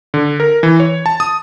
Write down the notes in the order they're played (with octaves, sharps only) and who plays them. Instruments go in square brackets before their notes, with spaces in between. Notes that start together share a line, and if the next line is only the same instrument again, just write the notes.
[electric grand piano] D3
A#4
E3
C#5
A5
D#6